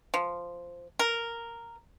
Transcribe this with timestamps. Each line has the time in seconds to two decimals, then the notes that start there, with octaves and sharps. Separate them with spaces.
0.14 F3
0.99 A#4